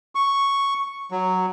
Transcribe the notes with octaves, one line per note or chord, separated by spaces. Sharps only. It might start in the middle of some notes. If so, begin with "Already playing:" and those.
C#6
F#3